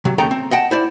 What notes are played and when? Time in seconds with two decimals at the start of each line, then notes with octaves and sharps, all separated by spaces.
0.05 C3 F#3
0.18 D#2 C#3 A3 A4 G5 A#5
0.31 C4
0.51 D#5 F#5 G5 A5
0.71 E4 C5 D5